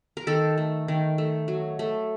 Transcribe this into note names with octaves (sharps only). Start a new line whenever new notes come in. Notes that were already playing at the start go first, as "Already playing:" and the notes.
A#4
D#3 A4
A3
D#3
A3
F#3
A3